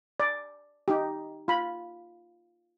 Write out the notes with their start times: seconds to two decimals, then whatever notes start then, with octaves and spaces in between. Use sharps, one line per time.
0.20 D5
0.88 D#4 G4
1.48 F4 B5